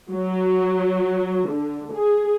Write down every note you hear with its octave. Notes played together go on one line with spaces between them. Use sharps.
F#3
D3
G#4